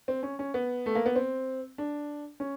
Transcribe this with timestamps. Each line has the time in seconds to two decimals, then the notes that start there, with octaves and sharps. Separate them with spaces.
0.08 C4
0.23 C#4
0.39 C#4
0.54 B3
0.86 A3
0.95 A#3
1.06 B3
1.15 C4
1.78 D4
2.40 C#4